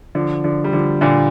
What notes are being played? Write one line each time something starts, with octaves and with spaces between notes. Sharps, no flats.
D3 F3
D3 F3
G3
D3 F3
A#2 D3